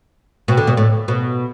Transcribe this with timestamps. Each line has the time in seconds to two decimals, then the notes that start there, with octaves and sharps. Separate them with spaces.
0.48 B2
0.57 D3
0.67 B2
0.77 A2
1.08 B2